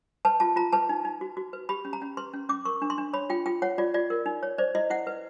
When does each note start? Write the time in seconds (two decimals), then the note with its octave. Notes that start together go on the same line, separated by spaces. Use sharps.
0.25 B4 A5
0.40 F4 A5
0.56 F4 A#5
0.73 B4 A5
0.89 D#4
1.05 D#4
1.21 F#4
1.37 F#4
1.53 B4
1.69 G4 B5
1.85 C#4
1.93 A#5
2.02 C#4
2.17 B4 C6
2.33 C#4
2.49 C#4 D6
2.65 A#4 C#6
2.82 D4
2.90 C6
2.98 D4
3.13 C#5 B5
3.30 F4 G5
3.46 F4 G5
3.62 C#5 F#5
3.78 F4 D5
3.94 F4 D5
4.10 A#4
4.26 D#4
4.43 C#5
4.58 C5 D5
4.75 E4 D#5
4.90 E4 F#5
5.07 B4